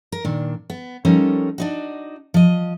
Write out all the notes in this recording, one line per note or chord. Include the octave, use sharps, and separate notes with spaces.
A#4
A#2 D#3 D4
B3
F3 G3 C#4 D#4 A4 A#4
D4 D#4 F#4
F3 D#5